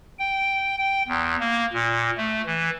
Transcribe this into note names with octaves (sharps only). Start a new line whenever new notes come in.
G5
G5
E2
A#3
A#2
A3
E3